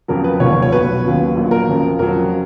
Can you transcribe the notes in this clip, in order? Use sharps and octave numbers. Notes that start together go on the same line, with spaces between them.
F2 C#3 F#3 A#4
B4
F1 D#2 D#3 F#3 C#5
C#5
B1 B2 F#3 B4
D#2 C#3 F#3
A#1 A#2 F#3
A#4
F#1 F2 C#3
F2 C#3 F#3 A#4